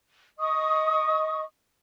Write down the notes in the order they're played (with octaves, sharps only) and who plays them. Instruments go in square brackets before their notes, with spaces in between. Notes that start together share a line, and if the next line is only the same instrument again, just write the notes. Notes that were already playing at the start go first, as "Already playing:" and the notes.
[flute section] D#5 C#6 D#6